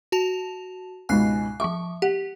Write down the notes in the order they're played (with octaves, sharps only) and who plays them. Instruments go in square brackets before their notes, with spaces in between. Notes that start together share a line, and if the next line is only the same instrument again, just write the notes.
[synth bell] F#4 A5 F7
[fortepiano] C#2 G#2 B2 [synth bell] G#5 F#6 C7
[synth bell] F3 E5 [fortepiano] C#6 D6
[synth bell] G4 [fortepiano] F#5